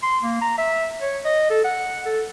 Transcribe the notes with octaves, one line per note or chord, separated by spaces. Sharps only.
C6
A#3
A#5
E5
C#5
D#5
A4
F#5
A4